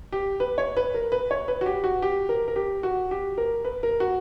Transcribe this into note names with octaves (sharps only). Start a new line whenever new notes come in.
G4
B4
C#5
B4
A#4
B4
C#5
B4
F#4
G4
F#4
G4
A#4
A#4
G4
F#4
G4
A#4
B4
A#4
F#4